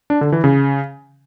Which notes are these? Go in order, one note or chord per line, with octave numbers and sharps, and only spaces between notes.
D4
D3
E3
C#3